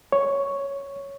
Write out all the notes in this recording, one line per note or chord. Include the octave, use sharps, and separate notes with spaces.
C#5